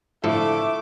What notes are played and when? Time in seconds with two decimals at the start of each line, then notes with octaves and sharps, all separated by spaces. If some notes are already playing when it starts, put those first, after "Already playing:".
0.24 A2 D3 F3 A3 A4 E5 D6